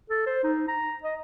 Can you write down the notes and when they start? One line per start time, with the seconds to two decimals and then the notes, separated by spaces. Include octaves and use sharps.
0.10 A4
0.26 C5
0.44 D#4
0.68 A#5
1.04 D#5